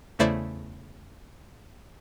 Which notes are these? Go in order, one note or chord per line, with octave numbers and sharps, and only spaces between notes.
E2 C#3 A3 E4 C5 D5